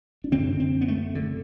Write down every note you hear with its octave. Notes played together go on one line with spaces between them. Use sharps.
D4
F#2 D3 C4
C4
B3
A3
D3